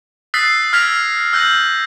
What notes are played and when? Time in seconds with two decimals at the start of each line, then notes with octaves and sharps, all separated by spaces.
0.34 D#6 E6 F#6 A6 B6 C7
0.73 E6 F6 G#6 A#6 B6 F7
1.33 E6 F#6 G6 A#6 F#7